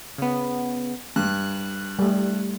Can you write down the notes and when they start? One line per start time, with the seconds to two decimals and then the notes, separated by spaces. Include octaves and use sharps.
0.18 C#3 B3
1.16 G2 F#6
1.99 G3 A3